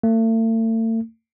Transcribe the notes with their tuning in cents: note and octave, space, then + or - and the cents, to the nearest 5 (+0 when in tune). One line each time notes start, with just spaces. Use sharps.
A3 +40